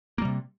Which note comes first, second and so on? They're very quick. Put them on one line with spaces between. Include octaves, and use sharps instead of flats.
A#3 G3 C3